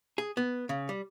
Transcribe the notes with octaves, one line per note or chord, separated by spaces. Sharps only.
G#4
B3
C#3
G3